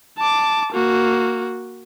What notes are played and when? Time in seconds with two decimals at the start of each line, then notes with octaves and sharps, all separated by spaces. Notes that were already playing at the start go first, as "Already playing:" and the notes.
0.19 A5 D6
0.72 A#3 F#4